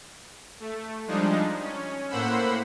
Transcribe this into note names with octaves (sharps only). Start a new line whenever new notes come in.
A3
F3 G3 G#3 D4 D#4
C#4
A2 A#3 C5 F#5 B5 E6